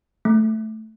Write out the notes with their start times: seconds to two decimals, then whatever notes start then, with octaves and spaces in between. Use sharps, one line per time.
0.25 A3